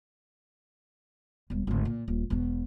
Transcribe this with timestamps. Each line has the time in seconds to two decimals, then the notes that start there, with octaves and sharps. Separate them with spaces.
1.50 E1 G2
1.67 G#1 D2
1.85 A#2
2.08 D#1
2.30 E1 B2